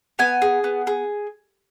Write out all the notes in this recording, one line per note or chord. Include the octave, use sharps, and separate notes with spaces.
B3 G#5
G#4
B3
G#4